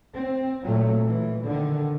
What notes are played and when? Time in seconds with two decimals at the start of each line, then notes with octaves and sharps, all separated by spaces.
0.13 C4
0.63 A#2 F#3 A3
1.05 E3
1.44 D3 D#3